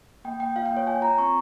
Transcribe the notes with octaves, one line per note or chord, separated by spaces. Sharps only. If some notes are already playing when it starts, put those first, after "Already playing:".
A#3 G5
A#3 G5
F4 F5
G5
A#3
C#5
F4 G#5
F4 A#5
C4 C#6